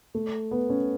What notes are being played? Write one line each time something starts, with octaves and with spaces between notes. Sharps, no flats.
A3
B3
C#4